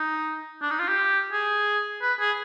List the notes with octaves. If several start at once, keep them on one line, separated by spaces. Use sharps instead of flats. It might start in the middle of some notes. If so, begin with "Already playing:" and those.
Already playing: D#4
D4
D#4
F4
G4
G#4
B4
G#4